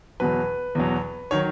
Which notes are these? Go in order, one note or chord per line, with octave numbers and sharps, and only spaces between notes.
E2 B2 F#3 B4
E2 B2 F#3
D#3 F#3 C#5